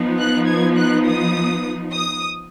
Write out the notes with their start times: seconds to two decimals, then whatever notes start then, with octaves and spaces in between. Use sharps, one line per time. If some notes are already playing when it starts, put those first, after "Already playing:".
Already playing: F3 B3 D#4
0.19 F#6
0.47 G#6
0.77 F#6
1.06 D#6
1.92 D#6